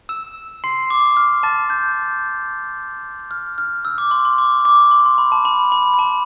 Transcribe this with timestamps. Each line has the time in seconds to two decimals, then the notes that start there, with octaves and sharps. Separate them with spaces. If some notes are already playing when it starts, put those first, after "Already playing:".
0.09 E6 E7
0.64 C6 C7
0.90 D6
1.17 F6
1.43 A5 A6
1.70 G6
3.31 F6
3.58 F6
3.85 E6
3.98 D6
4.11 C6
4.25 C6
4.38 D6
4.65 D6
4.91 C6
5.06 C6
5.18 B5
5.32 A5
5.45 B5
5.72 B5
5.94 B5
5.99 A5